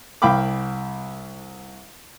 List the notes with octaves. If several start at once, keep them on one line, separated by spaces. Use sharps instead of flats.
C2 F5 G5 B5 D6